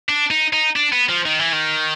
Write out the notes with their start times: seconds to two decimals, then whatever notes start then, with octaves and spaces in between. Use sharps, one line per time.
0.09 D4
0.31 D#4
0.53 D#4
0.76 D4
0.92 B3
1.09 F3
1.26 D#3
1.39 E3
1.53 D#3